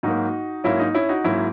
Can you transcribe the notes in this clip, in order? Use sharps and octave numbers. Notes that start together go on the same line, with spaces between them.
G#2 F#3 A#3 D#4 F#4
G#2 F#3 A#3 C#4 E4
D#4
C#4 E4
D#4 F#4
G#2 F#3 A#3 C#4 E4